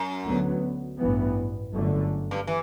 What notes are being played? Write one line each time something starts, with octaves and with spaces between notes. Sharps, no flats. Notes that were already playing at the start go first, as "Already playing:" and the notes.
Already playing: F#2
D2 D3 F#3 B3
A1 G2 E3 B3
G1 F#2 D3 A3
G2
E3